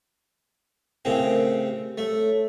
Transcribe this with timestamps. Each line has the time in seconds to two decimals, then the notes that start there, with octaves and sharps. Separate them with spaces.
1.05 A2 C#3 C4 A#4
1.68 G4
1.98 A3 A4 C#5